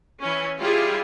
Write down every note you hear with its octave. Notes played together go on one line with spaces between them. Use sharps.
E3 C#4
G3 E4 F4 G4 G#4